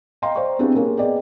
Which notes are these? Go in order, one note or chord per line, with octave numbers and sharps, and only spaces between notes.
D#5 F5 G5 A#5 C6
C5 D5 F5 C#6
B3 C4 D4 E4 G4 G#4
A#3 C#4 G#4 A#4
B3 G#4 D5 D#5 G5